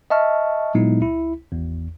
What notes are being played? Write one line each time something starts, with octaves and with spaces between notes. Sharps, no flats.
D#5 E5 A5 C#6 F6
A#2 F#3 G#3 B3 D#4 E4
C#2 E4
G#1 E2